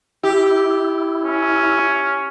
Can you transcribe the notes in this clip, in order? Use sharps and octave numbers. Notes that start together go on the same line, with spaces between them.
E4 G4
C#4